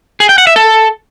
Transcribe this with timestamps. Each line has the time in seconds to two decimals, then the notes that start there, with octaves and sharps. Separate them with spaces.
0.20 G#4
0.29 G5
0.38 F#5
0.47 E5
0.56 A4